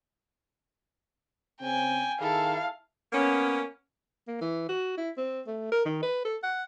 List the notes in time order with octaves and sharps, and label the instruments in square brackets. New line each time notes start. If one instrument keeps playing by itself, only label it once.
[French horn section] C#3 C4 [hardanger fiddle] G5 G#5
[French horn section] D#3 G#4 [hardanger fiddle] E4 A4 [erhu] F5
[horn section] A#3 B3 C#4
[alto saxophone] A#3
E3
F#4
E4
C4
A3
A#4
D#3
B4
A4
F#5